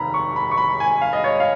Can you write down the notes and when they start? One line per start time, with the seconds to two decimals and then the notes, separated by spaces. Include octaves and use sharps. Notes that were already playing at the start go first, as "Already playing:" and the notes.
Already playing: F1 D#2 D#3 A#5 B5
0.14 C#6
0.36 B5
0.51 C#6
0.58 B5
0.80 G#5
1.02 F5
1.13 D#5
1.24 C#5
1.40 F5